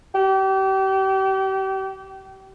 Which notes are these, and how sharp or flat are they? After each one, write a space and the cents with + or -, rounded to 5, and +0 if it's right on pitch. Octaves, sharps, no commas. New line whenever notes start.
G4 -35